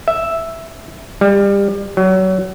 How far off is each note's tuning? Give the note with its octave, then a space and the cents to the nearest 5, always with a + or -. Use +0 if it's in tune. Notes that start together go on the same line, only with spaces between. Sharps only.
E5 +0
G3 +25
F#3 +25